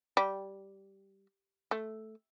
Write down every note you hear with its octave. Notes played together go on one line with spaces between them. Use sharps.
G3
A3